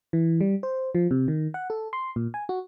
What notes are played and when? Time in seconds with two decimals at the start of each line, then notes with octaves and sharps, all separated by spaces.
0.13 E3
0.41 G3
0.63 C5
0.95 F3
1.11 C3
1.28 D#3
1.54 F#5
1.70 A4
1.93 C6
2.16 A#2
2.34 G#5
2.49 F#4